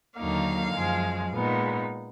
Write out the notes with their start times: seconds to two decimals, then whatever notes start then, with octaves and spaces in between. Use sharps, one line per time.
0.17 D#2 D3 F#3 A#3 D#4 F5
0.74 F#2 F3 G#3
1.30 A#2 G#3 B3 D#4